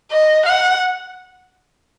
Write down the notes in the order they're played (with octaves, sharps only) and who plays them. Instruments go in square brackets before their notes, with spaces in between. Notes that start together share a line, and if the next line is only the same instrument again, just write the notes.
[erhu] D#5
F#5